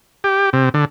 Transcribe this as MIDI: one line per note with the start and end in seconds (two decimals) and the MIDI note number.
0.24 0.50 67
0.53 0.69 48
0.74 0.85 50